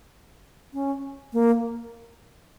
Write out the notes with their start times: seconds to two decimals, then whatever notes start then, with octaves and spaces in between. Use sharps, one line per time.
0.73 C#4
1.33 A#3